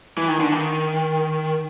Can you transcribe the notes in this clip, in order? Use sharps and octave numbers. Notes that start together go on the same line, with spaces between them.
E3
D#3
D3
D#3